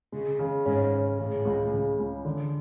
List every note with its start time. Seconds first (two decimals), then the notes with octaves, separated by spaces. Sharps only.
0.12 C#3 G#3
0.39 C#3
0.66 G#2 C#4
0.93 C#4
1.19 A2 C#3
1.45 C#2
1.73 C#3
1.99 C#2
2.25 D3